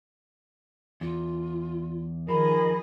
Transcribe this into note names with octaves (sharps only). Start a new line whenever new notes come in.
E2 F4
D#3 F3 G#4 A#4 D#5 B5